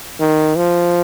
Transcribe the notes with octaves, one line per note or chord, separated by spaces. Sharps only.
D#3
F3